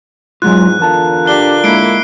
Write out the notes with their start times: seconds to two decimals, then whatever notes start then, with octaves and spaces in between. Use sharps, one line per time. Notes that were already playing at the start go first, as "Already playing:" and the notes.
0.42 E2 G#2 F#3 G#3 F4 F#6
0.79 E2 D3 F4 A#4 A5
1.26 D4 G4 F#6 G7
1.64 G#3 A#3 E4 C7 D7